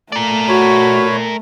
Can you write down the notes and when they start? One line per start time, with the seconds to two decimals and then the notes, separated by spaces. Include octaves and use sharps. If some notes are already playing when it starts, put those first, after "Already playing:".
0.12 A3 A#4 D5
0.48 F#4 C#5 B5